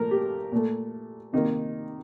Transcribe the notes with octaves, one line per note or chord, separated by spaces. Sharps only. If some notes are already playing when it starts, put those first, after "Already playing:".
Already playing: A#2 F3 A3 A#4
G4
A#2 A3
C3 D#3 A#3 D#4